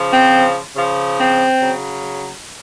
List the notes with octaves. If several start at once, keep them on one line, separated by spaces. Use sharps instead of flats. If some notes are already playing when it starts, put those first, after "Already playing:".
Already playing: C#3 F3
C4
C#3 F3
C4
C#3 F#3